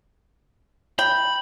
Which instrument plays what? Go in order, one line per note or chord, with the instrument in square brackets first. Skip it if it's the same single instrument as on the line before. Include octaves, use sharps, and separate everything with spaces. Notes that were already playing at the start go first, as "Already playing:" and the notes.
[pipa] G5 [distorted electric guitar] B5